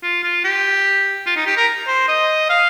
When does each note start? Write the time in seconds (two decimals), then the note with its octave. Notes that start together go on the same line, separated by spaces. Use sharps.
0.03 F4
0.24 F4
0.44 G4
1.26 F4
1.36 D#4
1.46 G4
1.57 A#4
1.88 C5
2.08 D#5
2.50 F5